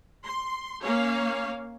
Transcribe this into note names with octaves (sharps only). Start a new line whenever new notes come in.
C6
A#3 C#4 C#5 F5